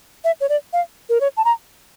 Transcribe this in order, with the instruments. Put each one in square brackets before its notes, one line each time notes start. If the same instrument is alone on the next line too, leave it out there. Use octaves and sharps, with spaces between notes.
[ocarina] E5
C#5
D5
F5
A#4
C#5
A5
A#5